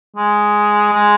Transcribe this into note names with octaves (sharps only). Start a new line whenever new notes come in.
G#3
G#3